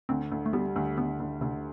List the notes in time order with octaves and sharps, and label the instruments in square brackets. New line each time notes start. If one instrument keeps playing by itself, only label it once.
[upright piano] D2 [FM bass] C4
[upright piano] D2
[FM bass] A3
[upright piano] G3 [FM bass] B3
[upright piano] D2
[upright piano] D2 [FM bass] B3
[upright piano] D2
[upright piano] D2 [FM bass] C3